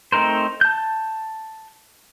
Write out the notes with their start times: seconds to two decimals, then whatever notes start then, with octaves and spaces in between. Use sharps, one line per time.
0.12 A3 C4 D#4 A#4 C5
0.61 A5 G6